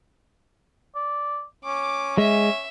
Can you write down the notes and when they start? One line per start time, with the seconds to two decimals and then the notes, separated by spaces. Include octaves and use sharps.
0.95 D5
1.65 C#4 D6
2.18 G#3 E5